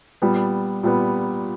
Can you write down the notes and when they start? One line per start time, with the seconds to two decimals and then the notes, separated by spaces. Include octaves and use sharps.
0.22 A#2 G3 B3
0.83 A#2 G3 B3